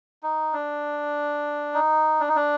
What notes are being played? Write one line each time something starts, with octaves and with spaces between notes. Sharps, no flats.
D#4
D4
D#4
D4
D#4
D4